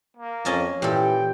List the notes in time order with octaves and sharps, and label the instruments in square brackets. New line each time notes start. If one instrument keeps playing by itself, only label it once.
[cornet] A#3
[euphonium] F2 [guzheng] C#4 D#5 A5
[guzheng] A#2 A4 [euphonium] E3 [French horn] G4 [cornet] G5